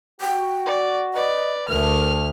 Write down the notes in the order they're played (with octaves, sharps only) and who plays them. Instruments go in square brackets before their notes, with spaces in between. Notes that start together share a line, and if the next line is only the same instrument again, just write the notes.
[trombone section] F#4 [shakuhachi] G5
[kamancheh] D5
[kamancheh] B4 D5 [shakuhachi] D#5
[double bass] D2 [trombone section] A3 [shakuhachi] A#4 [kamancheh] F6